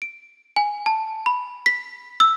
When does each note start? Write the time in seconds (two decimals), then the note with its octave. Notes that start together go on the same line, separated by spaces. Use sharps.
0.02 D7
0.56 G#5
0.86 A5
1.26 B5
1.66 B6
2.20 E6